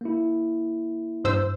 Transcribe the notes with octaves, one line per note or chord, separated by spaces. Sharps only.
A#3 E4
G2 C5 E6